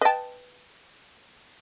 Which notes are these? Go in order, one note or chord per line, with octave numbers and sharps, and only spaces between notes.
B4 D#5 G5 A5